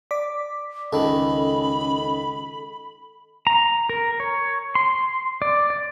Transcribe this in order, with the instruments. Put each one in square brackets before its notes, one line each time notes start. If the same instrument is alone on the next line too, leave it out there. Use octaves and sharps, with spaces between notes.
[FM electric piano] D5 D6 B6
[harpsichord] C#2 D#3 [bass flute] C#4 [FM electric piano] A4 [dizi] B5
[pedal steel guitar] A#5
A#4
C#5
C6
D5
D5